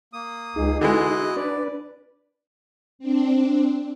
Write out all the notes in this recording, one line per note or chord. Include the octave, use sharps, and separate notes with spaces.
A#3 D#6
C#2 D#4 G#4
D3 E3 G#3 E4 F#4 D#5 F#6
D4 B4 D5
C4 D4